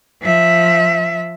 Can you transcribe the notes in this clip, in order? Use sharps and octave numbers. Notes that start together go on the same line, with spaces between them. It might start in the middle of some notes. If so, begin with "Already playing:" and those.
F3 E5